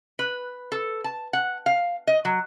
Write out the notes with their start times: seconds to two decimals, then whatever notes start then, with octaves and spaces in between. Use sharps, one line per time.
0.19 B4
0.72 A4
1.04 A5
1.33 F#5
1.66 F5
2.07 D#5
2.25 F#3